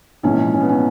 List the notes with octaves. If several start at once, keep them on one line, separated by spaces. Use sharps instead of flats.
A#1 G#2 E3 C#4
C#4
B3
C#4